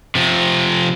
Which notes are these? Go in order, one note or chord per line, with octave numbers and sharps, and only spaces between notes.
C3 F3